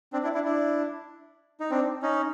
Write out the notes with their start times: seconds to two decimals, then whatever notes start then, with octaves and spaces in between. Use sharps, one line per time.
0.13 C4 D4
0.23 D4 E4
0.34 D4 E4
0.44 D4 E4
1.60 D#4
1.70 C4 D4
2.03 C#4 D#4